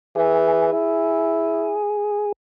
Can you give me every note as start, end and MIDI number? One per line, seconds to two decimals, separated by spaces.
0.16 0.71 52
0.16 2.32 68
0.73 1.75 64